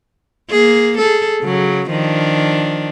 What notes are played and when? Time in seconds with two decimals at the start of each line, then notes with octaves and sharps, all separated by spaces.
0.49 A#3 G#4
0.98 G#4 A4
1.41 C#3 F#3
1.90 D#3 F3 D4